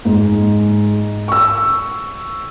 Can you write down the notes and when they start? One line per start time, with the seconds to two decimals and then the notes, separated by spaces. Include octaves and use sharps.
0.05 G#2
1.28 C#6 E6